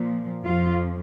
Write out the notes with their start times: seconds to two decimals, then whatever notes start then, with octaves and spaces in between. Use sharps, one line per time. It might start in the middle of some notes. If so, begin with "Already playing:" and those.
Already playing: A#2 F3
0.43 F2 F3 F4